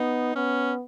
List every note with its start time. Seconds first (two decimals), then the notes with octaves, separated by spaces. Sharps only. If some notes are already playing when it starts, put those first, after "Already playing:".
Already playing: B3 D#4
0.35 B3 C#4